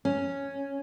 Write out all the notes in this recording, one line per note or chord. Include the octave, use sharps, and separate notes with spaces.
C#4